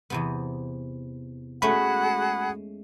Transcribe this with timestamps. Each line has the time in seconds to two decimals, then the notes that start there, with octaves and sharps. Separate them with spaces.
0.10 E2 C3 B3
1.62 G#3 A3 C#4 F#4 G#4 F#5 B5